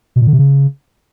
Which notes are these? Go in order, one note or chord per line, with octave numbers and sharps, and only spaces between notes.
B2
A#2
D3
C3
C#3